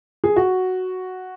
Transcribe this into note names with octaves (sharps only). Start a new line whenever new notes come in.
G#4
F#4